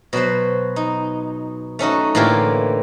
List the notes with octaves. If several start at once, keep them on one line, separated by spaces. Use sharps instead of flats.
B2 F#3 B4 C5
D#4
A3 C#4 D#4 F#4
A2 D3 E3 A#3 F4 G4